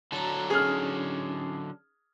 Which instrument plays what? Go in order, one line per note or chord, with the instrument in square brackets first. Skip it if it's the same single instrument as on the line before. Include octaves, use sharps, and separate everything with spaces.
[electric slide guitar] D3 F#3 A4 [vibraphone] F#4 A#5
[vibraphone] C#4 D#4 [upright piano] G#4 F6